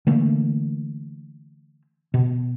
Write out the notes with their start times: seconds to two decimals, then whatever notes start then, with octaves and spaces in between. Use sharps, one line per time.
0.07 D3 E3 A3 A#3
2.14 B2